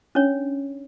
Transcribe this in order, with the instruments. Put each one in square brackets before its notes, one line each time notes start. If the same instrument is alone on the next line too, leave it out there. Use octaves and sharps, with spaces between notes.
[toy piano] C#4 D4 C#5